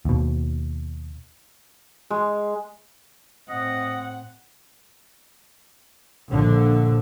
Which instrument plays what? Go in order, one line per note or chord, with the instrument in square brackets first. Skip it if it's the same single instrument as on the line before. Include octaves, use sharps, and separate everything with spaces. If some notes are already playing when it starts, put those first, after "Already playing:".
[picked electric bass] D#2 B2
[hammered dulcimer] G#3
[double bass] A2 C4 [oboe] D#5 [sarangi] F#5
[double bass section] A#1 D3